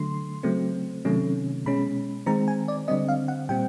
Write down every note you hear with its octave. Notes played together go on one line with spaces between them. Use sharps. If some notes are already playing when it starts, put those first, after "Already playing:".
Already playing: D3 F#3 A3 C6
C#3 F#3 A3 C4
C3 D#3 F#3 A3 C#4
B2 G#3 C#4 B5
D#3 G#3 C4 A#5
G#5
D5
D3 G3 C4 D#5
F5
F#5
A#2 G3 C4 G5